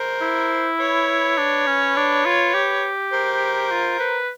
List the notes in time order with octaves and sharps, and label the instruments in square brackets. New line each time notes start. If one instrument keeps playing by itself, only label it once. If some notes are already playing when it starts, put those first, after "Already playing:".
Already playing: [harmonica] A#4 C5
[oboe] E4
[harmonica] B4 C#5
[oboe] D4
C#4
D4
F4
G4
[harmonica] A#4 C5
[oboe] F4
B4